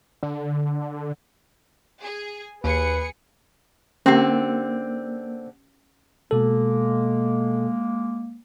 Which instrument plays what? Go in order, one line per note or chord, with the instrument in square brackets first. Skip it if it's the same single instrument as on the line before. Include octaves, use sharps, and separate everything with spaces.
[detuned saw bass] D3
[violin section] G#4
[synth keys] D#2 [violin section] G#4 C#7 [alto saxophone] B4
[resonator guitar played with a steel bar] D3 C4 [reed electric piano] A#3 [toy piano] C#4 G4
[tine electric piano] B2 A4 [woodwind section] G#3 A#3